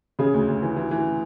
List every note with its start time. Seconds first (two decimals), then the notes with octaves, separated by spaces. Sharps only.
0.19 C#3 G#4
0.34 D2
0.48 D2
0.62 E3
0.76 E3
0.91 E3